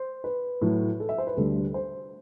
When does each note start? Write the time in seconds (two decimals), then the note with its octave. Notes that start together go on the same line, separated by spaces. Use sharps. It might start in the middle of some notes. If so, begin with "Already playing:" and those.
Already playing: C5
0.24 B4
0.61 A2 F#3 A3
1.00 A4
1.09 E5
1.18 C5
1.27 B4
1.37 D2 D3 G3 A4
1.74 C5